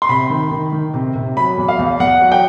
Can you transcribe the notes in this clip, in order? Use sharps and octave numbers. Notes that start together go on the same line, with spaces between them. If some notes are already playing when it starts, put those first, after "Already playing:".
C6
C3 B5
D#3
D#3
D#3
C3
C3
F#3 B5
E2
F5
E2
E2 F#5
F#3
G5